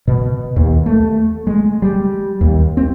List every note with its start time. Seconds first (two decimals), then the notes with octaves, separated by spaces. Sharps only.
0.07 B2
0.56 D#2
0.86 A3
1.47 G#3
1.82 G3
2.41 D#2
2.77 C4